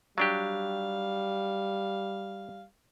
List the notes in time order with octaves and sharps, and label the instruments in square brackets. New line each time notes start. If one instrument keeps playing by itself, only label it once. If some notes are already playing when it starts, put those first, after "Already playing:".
[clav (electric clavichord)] F#3 D4 G4 [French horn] G3 [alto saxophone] F5